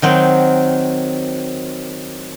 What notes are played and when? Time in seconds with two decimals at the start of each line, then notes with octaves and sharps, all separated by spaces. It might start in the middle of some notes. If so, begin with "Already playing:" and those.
0.02 D#3 F#3 C4